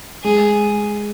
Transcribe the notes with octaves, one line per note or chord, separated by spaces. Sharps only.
G#3 G#4